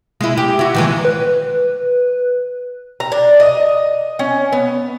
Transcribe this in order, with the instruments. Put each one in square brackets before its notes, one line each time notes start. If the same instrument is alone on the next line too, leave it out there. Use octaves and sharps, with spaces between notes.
[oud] G#3 E4
G4
E4 F#4
D#3 E3 G#3
[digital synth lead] B4
[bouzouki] A#5
D4
D#5
C#4
B3